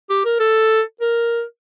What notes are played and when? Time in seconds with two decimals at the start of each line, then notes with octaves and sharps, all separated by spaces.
0.10 G4
0.25 A#4
0.40 A4
1.01 A#4